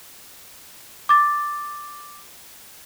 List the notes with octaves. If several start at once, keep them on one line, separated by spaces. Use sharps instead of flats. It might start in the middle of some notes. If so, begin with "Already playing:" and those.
D6 A6